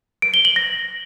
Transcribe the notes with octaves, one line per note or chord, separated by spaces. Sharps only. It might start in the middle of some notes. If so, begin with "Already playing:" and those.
D7
G7
F#7
A#6